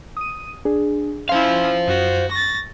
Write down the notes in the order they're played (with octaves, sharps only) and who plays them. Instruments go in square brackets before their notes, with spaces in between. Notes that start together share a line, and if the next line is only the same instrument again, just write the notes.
[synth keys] D#6 D#7
D4 G#4
[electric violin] C#4 E4 [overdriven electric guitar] C5 F5 [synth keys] C6
[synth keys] F#2 [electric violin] F#4
[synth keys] C#6 [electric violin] A6 A#6